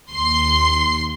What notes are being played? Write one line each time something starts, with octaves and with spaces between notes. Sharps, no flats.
D#2 C6 C7